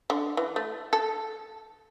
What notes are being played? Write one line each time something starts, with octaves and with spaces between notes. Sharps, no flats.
D3
E3
A3
A4